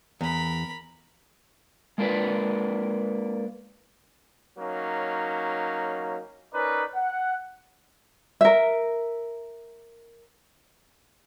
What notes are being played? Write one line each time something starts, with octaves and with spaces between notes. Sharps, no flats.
E2 A#4 B5
G#3 A#3 D4 F4 B4
F#3 A#3 C#4 D#4
C#4 D#4 A#4 B4 D5 A#5
F#5
A#4 E5